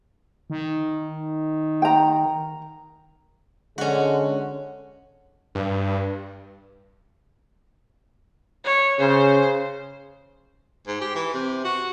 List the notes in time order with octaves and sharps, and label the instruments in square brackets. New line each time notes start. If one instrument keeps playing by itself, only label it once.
[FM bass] D#3
[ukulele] G5 A#5
[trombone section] D3 G#3 [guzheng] C#4 F#4
[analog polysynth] G2
[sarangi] C#5
[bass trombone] C#3 [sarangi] C5
[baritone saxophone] G#2
G4
E3
C3
F#4